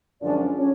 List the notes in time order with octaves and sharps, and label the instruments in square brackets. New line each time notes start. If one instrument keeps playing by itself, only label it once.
[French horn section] F#2 D3 F3 G#3 C#4 [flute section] D4 D5
[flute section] C#4 C#5